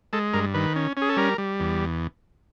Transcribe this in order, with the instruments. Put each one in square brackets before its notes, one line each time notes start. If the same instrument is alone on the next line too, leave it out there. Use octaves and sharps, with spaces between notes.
[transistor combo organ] G#3 A4
G2 A#4
D#3 B4
C#4
C#4 G#4
A4
G3 A#4
G3
E2